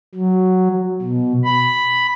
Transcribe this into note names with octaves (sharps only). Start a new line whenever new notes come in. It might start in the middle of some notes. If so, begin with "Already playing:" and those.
F#3
B2
B5